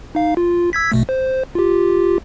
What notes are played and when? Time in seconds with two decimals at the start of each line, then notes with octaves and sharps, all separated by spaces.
0.15 D#4 F5
0.37 F4
0.73 E6 G#6 B6
0.92 A#1 B2 A3
1.09 C5
1.55 F4 G4